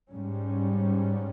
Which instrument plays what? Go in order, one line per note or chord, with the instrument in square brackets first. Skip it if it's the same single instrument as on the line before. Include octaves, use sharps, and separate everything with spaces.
[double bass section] G#2 G3 C#4